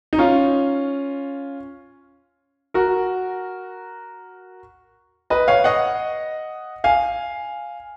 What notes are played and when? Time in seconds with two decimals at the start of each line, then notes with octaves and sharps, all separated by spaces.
0.13 D#4
0.19 C#4 F4
2.74 F#4 A#4
5.30 B4 D#5
5.48 C#5 F5
5.64 D#5 F#5
6.84 F5 G#5